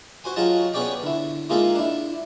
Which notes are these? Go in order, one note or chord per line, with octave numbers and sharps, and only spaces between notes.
F#4 C5 G#5
F#3 F4 G#4 D#5 A5
B3 C#4 G#4 C#5 D5 G5
D3 E4
G#3 A#3 D#4 F4 G#4 A4
D4 E4